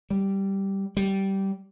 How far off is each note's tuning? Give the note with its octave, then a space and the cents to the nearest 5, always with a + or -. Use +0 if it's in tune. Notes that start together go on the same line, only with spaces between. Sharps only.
G3 -5
G3 -15